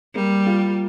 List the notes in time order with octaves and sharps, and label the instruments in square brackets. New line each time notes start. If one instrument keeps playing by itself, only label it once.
[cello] G3 [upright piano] A#3
[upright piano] F4